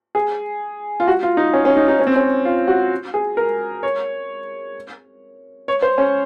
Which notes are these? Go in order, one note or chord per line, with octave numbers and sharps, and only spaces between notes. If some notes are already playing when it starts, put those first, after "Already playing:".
G#4
F4
F#4
F4
D#4
C#4
C#4
D#4
D#4
C#4
C4
C#4
F4
F#4
G#4
A#4
C#5
C#5
C5
C#4